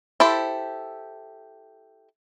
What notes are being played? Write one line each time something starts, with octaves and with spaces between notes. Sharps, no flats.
E4 G4 A4 C5